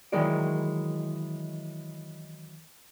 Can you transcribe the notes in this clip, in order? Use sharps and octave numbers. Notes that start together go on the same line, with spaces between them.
D#3 E3 F#3 G#3 A#4 D5